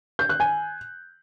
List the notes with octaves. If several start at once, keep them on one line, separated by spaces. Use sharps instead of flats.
G6
F#6
G#5